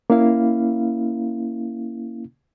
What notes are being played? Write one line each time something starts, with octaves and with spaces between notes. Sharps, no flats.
A#3 C#4 E4 F5